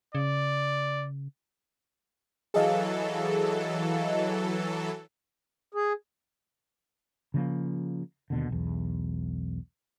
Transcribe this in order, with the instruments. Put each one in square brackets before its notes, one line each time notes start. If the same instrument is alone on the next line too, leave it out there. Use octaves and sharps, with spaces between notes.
[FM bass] C#3 [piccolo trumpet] D5
[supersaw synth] E3 F#3 A4 [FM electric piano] G#4 D#5 F5
[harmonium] G#4
[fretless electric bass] C#3 F3 A#3
D#2 B2 D3
B1 E2